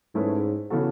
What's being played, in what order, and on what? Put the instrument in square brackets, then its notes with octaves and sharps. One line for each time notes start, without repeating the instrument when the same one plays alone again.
[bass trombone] G#2 [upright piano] A3 C#4 E4 G#4 B4
[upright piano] C#3 E3 B3 F#4 A4